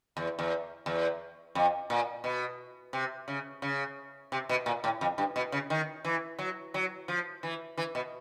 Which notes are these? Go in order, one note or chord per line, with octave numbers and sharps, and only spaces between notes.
E2
E2
E2
F2
A#2
B2
C3
C#3
C#3
C3
B2
A#2
A2
F2
G2
B2
C#3
D#3
E3
F#3
F#3
F3
E3
E3
B2